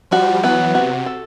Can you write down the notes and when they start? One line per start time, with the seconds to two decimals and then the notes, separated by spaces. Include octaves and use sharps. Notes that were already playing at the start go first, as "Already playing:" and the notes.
0.11 F3 G3 F#4
0.43 E3 F#3 B3
0.75 C3 F#4
1.06 A4